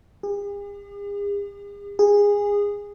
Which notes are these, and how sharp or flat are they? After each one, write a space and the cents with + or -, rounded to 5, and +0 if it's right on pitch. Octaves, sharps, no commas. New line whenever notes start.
G#4 -45
G#4 -20